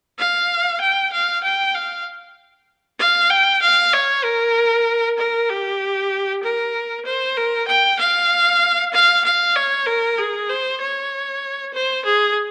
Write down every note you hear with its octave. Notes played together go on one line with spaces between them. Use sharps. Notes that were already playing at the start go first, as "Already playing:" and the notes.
F5
G5
F5
G5
F5
F5
G5
F5
C#5
A#4
A#4
G4
A#4
C5
A#4
G5
F5
F5
F5
C#5
A#4
G#4
C5
C#5
C5
G#4